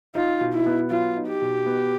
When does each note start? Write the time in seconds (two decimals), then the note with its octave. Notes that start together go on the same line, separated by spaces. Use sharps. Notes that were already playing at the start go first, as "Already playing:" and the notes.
0.15 D#4 F4
0.41 B2
0.53 E4
0.66 B3
0.90 F#3 F4
1.17 D#4
1.29 G4
1.42 B2
1.66 B3